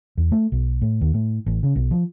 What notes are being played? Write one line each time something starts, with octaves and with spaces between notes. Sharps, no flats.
E2
A3
B1
A2
D#2
A2
A1
C#3
B1
F3